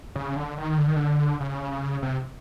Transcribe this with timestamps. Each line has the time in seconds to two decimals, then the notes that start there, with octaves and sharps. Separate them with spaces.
0.16 C#3
0.36 D3
0.58 D#3
0.78 D3
0.88 D#3
0.96 D3
1.40 C#3
2.03 C3